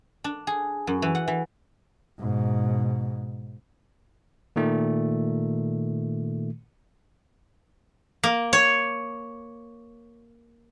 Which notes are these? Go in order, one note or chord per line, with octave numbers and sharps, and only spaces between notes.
D4
G#4
F#2
E3
F#5
E3
G#2 B2
A#2 D#3 A3
A#3
C#5